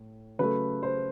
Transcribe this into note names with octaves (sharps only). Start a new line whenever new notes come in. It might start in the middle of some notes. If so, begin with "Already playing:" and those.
Already playing: A2
C#3 F#3 A3 B4
C5